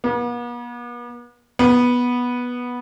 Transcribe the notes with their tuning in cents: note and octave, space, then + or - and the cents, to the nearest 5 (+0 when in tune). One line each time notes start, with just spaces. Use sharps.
B3 -45
B3 -10